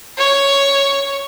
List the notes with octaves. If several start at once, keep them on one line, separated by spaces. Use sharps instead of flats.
C#5 C#6